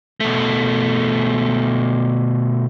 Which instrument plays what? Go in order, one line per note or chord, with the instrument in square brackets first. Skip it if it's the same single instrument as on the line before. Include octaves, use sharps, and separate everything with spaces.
[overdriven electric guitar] B2 A3